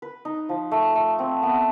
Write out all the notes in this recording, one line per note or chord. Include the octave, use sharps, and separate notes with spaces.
B4
D#4
F3
A3
A3
C4
B3